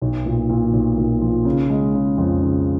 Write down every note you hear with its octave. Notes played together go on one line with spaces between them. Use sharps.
B1
A#2
A#2
B1
A#2
F3
C#3
G#3
C#3
F2
C#3